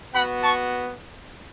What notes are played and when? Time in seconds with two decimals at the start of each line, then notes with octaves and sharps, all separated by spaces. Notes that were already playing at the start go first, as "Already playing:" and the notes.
0.14 B3 F#4 F#5 B5
0.42 A5 C#6